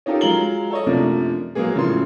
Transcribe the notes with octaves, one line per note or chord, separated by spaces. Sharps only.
C#4 D#4 F4 G4 A4 A#4
F#3 G#3 F4 A#5 F#7 G7
A4 C#5 D#5
F#2 C3 F3 A3 A#3 D4
F#3 G#3 A#3 B3 G#4
A2 C#3 F3 F#3 G#3 C6